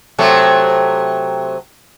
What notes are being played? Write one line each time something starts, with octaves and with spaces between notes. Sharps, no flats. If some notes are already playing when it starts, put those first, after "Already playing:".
C3 F#3 A3